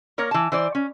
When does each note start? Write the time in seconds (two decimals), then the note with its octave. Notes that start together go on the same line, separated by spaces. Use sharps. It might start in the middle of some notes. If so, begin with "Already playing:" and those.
0.18 A#3 A#4 C#5
0.31 E3 A5
0.52 E3 C5 D5
0.75 C#4